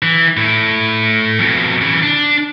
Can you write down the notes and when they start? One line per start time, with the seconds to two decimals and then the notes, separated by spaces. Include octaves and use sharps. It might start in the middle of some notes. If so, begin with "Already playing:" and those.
0.02 E3
0.37 A2
1.39 F2 B2
1.81 C#3 E3
2.02 D4